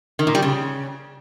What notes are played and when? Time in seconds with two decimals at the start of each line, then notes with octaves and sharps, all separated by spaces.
0.19 D#3
0.27 A#2
0.35 G3
0.42 C#3